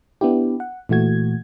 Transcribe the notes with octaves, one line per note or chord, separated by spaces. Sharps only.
B3 D4 E4 G4
F#5
A#2 E3 A3 F#4 G#6